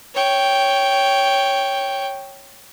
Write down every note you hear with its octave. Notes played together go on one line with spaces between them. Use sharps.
C#5 G5